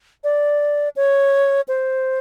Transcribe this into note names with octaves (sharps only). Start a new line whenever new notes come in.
D5
C#5
C5